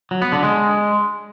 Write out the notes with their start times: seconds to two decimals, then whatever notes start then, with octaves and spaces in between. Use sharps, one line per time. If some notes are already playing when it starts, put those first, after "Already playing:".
0.11 F#3
0.22 B3
0.32 D3
0.43 G#3